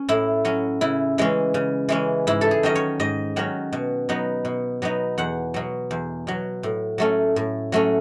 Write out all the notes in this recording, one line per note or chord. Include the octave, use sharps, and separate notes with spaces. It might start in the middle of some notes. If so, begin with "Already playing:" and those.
Already playing: C#4
A2 E4
F#3 C#4
C#3 E4
E3 G#3 C#4
C#3
E3 G#3 C#4
G#2 E4
A4
G#4
D#3 F#3 C#4 D#5
C#5
G#2 D#5
D#3 F#3 C#4
B2
F#3 B3 D#4
B2
F#3 B3 D#4
E2 F#5
B2 F#3
E2
B2 F#3
A2
F#3 A3 C#4
A2
F#3 A3 C#4